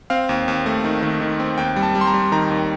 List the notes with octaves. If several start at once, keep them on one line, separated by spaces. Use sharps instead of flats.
C4 F5
D#2
D#2
A3
D#3
D#3
D#3
C4
D#2 G5
G3
A5
G3
C6
A#5
G3
D#3 A#5
D#2